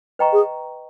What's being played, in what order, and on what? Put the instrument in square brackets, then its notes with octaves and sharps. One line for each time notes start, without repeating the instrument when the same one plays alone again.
[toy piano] B4 D#5 G5 A#5 C#6
[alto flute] G#4